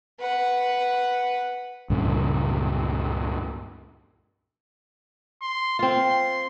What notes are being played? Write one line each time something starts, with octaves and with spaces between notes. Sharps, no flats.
B4 F#5
C#2 G2 A#2 C#3
C6
C4 F4 C6